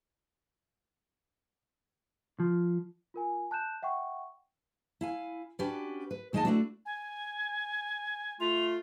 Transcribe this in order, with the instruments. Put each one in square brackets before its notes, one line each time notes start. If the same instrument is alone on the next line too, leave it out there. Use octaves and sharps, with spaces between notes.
[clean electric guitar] F3
[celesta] F4 A#4 G#5
A5 F#6 G6 E7
E5 F#5 G5 C#6
[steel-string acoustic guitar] E4 F5 G#5
C#4 D4 F#4 G4 B4
B4
D#2 G#3 D#4 D#5 G#5 A5
A3 C4 D4 E4 F#4
[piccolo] G#5
[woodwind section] A3 F4 [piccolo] F7